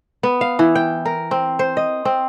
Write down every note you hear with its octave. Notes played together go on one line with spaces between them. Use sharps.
B3
F5
E3
G5
A#4
C4
C5
D#5
C4